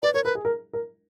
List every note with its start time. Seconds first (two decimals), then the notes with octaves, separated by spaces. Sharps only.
0.03 B4 D5
0.14 A#4 C#5
0.24 A#4 B4
0.35 G#4
0.45 A#4
0.73 A#4